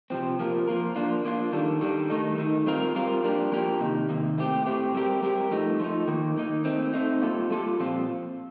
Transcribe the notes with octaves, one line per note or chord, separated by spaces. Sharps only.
C3 F3 C4
F3 A#3 F4 A#4
F3 A#3 F4 A#4
F3 A#3 D4 F4
F3 A#3 D4 F4
D#3 G3 D4 A4
D#3 G3 D4 A4
D#3 A3 D#4
D#3 A3 D#4
G3 C4 F4 A#4
G3 C4 F4 A#4
F3 A#3 D4 G4 A#4
F3 A#3 D4 G4 A#4
C3 D#3 A#3 D#4
C3 D#3 A#3 D#4
A2 A3 C4 G4
A2 A3 C4 G4
G3 C4 G4 A#4
G3 C4 G4 A#4
F3 A3 D#4
F3 A3 D#4
D#3 A#3 D#4
D#3 A#3 D#4
A3 C4 D#4
A3 C4 D#4
G3 A#3 F4 A4
G3 A#3 F4 A4
A#2 F3 C4 F4